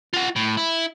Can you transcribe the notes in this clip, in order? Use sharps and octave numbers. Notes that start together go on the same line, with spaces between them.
F4 F#5
A2
E4